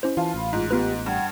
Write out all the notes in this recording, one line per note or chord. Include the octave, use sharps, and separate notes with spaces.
C#4 E4 C5
E3 F4 A5
A1 B5
G#2 F4
B3 F4 G4 B4
G2 F#5 G5 G#6